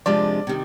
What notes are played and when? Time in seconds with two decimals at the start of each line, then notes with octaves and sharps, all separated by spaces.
0.06 C3 F3 G#3 D4 F4 D5
0.47 C3 D#3